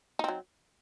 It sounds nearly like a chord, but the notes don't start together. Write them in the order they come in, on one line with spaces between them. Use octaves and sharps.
D#4 C4 F#3